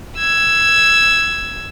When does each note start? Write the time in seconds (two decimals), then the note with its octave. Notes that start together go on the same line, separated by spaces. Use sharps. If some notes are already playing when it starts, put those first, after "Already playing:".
0.18 E6 G#6